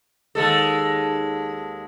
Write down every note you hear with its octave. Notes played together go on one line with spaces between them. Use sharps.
D#2 G#3 A4